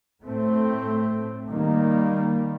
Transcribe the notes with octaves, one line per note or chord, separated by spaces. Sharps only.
A2 A3 C4
D#3 G3 A#3